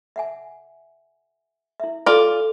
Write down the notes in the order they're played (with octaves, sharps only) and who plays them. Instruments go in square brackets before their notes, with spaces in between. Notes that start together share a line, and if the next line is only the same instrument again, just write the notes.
[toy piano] E5 F#5 G#5
E4 E5
[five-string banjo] F4 D5 [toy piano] A4 G#5